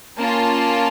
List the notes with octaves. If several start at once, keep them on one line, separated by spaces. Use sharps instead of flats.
A#3 C#4 F4 A5